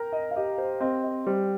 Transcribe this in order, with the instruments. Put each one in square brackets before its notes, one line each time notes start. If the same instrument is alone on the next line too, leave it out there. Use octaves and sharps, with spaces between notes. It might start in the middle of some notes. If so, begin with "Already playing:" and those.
Already playing: [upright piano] A#4 [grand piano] G5 A#5
[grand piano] D#5
F5
[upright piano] G4 [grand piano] D#5
[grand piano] C5
[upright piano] C4 [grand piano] D#5
[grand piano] D#5
[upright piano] G3 [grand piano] C5